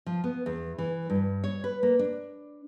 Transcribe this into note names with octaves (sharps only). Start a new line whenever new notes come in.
F3
B3
E2
E3
G2
C#5
B4
A#3
D4